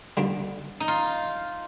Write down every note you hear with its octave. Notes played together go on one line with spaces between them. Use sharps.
D#2 D3 G3
D#4
F4